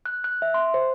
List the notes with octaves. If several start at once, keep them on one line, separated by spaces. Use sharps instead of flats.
F#6
F#6
E5
C6
C5